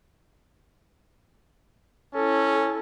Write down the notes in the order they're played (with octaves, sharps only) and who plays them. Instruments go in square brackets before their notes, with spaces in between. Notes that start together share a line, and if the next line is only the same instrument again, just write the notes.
[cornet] C#4 [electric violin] E4 A4